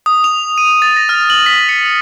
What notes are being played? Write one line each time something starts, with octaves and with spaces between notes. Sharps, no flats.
D#6
F7
D#7
A6
A#6
F6
F#7
B6
C#7
F#7